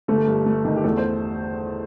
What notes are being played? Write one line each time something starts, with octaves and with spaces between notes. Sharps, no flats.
G1 A3 A4
G2
A3
D#3
G4
E2 A3 A4
C5